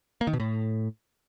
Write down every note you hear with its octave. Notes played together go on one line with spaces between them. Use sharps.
A#3
D#3
B2
A2